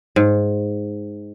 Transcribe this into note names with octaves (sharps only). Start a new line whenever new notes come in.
G#2